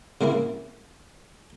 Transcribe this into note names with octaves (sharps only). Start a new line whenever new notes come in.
C#3 A#3 C4 E4